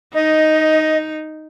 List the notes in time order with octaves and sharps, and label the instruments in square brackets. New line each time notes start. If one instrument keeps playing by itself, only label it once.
[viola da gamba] D#4 [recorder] D#5